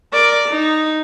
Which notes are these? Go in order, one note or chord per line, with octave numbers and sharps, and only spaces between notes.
A#4 D5
D#4